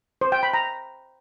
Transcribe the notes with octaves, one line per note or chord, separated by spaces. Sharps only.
C5
G5
B5
A#5